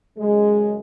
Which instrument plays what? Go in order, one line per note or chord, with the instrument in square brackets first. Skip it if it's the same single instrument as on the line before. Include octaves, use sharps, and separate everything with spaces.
[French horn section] F#2 C#3 G#3